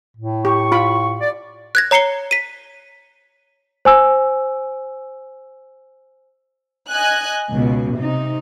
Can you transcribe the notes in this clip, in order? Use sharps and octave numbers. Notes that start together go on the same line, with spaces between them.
A2
G4 C#6
F4 B5
D5
F#6 G#6 A#6
C#5 A#5 C7 C#7 G7
B6 D#7
C5 G#5 E6
D#5 G#5 F#6
C#2 B2
C3 D#4